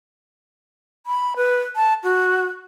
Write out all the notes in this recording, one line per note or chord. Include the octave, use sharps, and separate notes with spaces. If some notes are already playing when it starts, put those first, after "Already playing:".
B5
B4
A5
F#4